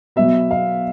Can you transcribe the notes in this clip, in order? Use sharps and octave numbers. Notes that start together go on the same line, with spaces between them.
B2 F#3 B3 E5
F5